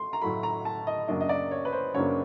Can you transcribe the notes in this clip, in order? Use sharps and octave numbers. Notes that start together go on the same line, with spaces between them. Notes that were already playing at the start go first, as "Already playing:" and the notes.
Already playing: A3 C6
A#5
A2 F#3 A3 B5
A#5
A5
D#5
F#2 C#3 F#3 A#3 D4 D#5
D#5
D5
C#5
B4
C5
F#2 C#3 F#3 A#3 D4 C#5